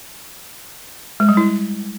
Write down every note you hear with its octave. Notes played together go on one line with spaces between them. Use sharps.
G#3
G3
E4